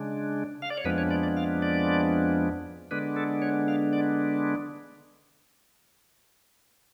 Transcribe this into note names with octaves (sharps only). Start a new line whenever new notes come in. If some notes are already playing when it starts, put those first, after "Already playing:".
Already playing: C#3 G#3 D4
F5
D5
C#5
F2 F3 G#3 B3 D4 B4
C#5
D5
D5
F5
D5
D3 G#3 B3 D4 B4
A4
C#5
F5
D5